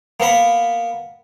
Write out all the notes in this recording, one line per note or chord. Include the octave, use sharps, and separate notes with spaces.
A#3 B3 A#4 B5